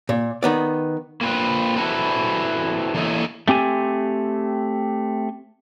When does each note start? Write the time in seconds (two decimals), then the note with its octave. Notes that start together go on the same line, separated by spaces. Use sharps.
0.09 A#2
0.43 D#3 B3 D5
1.21 A#3 C4 F4 B4
1.77 C4 E4 F#4 A4 B4
2.94 E3 A#3 E4 A4 C#5 D#5
3.48 A3 C4 G4 G#5